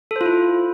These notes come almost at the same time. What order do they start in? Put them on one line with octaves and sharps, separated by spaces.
A4 C5 F4 E4